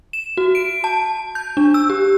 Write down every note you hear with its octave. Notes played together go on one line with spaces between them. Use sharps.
E7
F#4
D7
A5
G6
D4
E6
G4